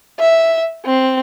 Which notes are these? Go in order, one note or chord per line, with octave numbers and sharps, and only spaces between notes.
E5
C4